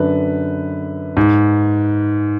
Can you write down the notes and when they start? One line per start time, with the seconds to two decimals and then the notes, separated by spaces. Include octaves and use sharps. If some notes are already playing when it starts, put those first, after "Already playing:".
Already playing: F#2 D3 B4
1.17 G#2